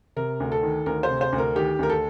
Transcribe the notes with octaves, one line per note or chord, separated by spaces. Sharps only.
C3 A#4
D2
A4
D#3
D2 A#4
C5
C3
C5
D2
A#4
D#3 G4
D2 A#4
A4